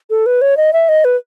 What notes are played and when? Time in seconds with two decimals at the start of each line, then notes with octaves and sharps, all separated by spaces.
0.10 A4
0.26 B4
0.42 C#5
0.57 D#5
0.73 E5
0.89 D#5
1.05 B4